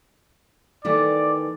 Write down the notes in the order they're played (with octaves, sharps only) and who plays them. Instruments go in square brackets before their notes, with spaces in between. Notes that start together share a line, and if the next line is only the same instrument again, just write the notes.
[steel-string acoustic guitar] D#3 E3 A3 [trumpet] D5